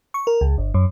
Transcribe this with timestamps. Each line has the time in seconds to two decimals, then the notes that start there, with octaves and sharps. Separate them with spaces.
0.14 C#6
0.27 A#4
0.41 C#2
0.58 G1
0.74 F#2